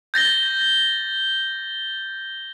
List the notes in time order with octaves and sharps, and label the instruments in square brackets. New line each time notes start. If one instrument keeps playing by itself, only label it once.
[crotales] G6 A6 A#6 G7